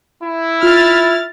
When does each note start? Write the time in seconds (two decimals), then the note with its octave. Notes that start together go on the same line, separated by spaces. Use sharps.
0.22 E4
0.63 F4 F6 A6